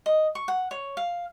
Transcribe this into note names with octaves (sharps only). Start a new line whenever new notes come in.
D#5
C#6
F#5
C#5
F5